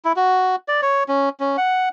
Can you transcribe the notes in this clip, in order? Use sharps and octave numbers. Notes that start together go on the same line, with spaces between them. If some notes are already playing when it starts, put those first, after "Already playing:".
E4
F#4
D5
C#5
C#4
C#4
F#5